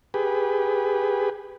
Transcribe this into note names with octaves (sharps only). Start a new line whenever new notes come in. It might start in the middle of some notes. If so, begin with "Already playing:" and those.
G4 G#4 B4